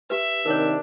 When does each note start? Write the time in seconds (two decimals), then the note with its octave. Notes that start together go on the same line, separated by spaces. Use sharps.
0.10 G4 B4 E5
0.46 C3 D#3 D4 A#4 C#5